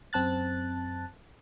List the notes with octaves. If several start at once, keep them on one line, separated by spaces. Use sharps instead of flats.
F#2 C4 A5 F#6 A6